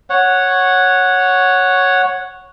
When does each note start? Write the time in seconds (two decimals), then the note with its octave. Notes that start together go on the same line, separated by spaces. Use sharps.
0.10 C#5 F#5